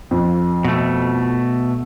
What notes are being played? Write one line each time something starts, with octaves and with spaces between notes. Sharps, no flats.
F2
B2 A3